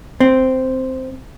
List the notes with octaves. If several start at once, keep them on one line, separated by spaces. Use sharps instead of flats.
C4